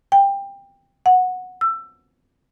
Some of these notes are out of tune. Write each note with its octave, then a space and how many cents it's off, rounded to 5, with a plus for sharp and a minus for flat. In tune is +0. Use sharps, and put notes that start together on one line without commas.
G5 +20
F#5 -10
E6 +20